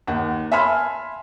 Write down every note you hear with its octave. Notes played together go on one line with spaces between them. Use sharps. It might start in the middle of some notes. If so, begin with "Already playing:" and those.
D#2 F#5
E5 G#5 A5 B5 C6 F6